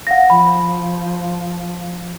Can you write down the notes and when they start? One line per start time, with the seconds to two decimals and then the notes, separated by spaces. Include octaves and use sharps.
0.07 F5 F#5 A#6
0.30 F3 B5